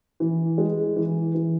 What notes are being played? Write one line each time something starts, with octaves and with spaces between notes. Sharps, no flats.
E3
G#3
E3
E3